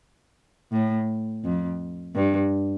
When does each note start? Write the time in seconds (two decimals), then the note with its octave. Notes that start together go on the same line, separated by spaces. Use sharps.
0.72 A2
1.44 F2
2.15 G2